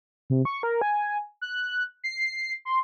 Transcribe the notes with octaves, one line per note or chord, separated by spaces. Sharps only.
C3
C#6
A#4
G#5
F#6
C7
C6